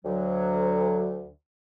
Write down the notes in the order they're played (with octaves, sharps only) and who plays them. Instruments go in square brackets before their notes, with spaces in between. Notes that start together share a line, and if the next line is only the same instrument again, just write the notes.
[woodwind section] D2 F#3